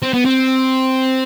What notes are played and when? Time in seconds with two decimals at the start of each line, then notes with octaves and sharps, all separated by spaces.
0.03 C4
0.14 B3
0.25 C4